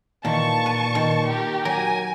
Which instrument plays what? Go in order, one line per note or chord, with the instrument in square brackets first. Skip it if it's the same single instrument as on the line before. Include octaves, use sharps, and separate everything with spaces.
[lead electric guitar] A#2 [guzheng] D#3 E3 [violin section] A5 C#6
[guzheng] B4
D#3
[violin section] G4 A#4
[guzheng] F#3 [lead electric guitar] A#4 [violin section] G#5